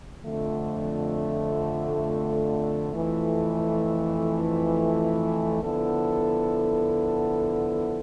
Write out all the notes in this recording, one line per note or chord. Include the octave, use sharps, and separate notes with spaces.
F2 D3 A3
F2 E3 A3
D3 F3 B3 E4 A4